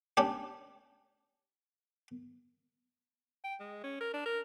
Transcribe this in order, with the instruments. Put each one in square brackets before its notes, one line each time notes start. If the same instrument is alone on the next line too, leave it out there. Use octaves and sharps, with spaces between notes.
[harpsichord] C#4 D4 G4
[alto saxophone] G5
G#3
C#4
A#4
D4
A#4